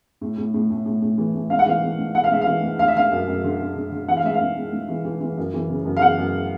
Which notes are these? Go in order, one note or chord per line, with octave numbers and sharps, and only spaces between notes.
A2
A2
A2
A2
A2
A2
E3
A2
G#2 F5
F#5
E3 F5
E3
G#2
G#2 F#5
F5
G#2 E5
F5
E3
G#2
D3 F5
E5
D3 F5
F#2
F#2
D3
D3
D3
D3
E3 F#5
F5
G#2 E5
F5
G#2
G#2
G#2
E3
E3
E3
F#2
E3
C#3
F#2
F5
E3 F#5
F#2